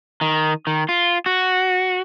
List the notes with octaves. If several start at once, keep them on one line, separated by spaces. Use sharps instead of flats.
D#3
D#3
F4
F#4